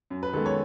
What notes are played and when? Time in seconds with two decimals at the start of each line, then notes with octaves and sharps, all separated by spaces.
0.10 F#2
0.23 B4
0.33 D#3 G#3 B3 A4
0.46 C#5